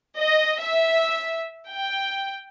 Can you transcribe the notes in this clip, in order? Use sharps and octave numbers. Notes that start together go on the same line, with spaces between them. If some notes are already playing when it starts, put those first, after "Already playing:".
D#5
E5
G5